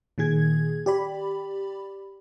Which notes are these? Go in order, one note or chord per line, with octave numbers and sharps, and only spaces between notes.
A#2 D#3 G#4 G#6
G4 D5 B5